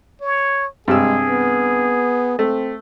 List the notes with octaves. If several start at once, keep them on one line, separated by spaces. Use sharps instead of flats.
C#5
G2 C3 G#3 G#4 E6
B3
A3 C4